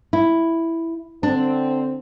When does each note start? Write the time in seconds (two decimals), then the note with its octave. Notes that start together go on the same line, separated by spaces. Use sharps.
0.13 E4
1.23 D3 C4 D4